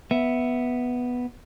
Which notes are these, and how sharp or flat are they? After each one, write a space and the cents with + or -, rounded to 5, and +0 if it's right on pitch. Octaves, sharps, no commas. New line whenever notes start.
B3 +0 E5 +0